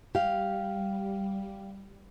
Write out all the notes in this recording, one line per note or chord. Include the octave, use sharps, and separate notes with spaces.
G3 G4 F5